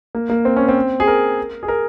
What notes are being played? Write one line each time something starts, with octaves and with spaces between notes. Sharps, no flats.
A#3
A#3
C4
C#4
C4
G#4
A#4
G#4
A#4